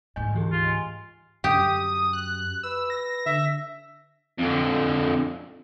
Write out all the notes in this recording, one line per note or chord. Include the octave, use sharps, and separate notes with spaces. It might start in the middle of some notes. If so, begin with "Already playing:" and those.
D2 G#2 D#5 G#5 G6
E3 G4 G#4
F4
D#5 G#5
F#2 G4 D#6
F#6
B4 E6
A#6
D3 E5
F2 D3